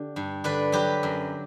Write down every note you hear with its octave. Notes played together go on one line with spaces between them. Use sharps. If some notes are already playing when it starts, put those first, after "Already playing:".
Already playing: D3 G4
G2
D3 B4 D5
F#3 G4 B4
F#2